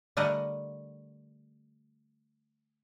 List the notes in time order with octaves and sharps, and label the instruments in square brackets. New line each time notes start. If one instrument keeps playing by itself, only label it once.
[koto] D3 G3 A3 A#4 D#5 F#5